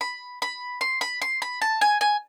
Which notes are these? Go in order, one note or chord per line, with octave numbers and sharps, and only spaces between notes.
B5
B5
C6
B5
C6
B5
A5
G#5
G#5